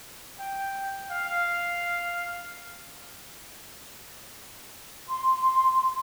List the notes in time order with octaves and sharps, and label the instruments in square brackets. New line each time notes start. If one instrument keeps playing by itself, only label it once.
[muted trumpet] G5
F5
[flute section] C6